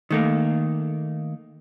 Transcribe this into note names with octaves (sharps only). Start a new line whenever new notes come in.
D#3 A3 A#3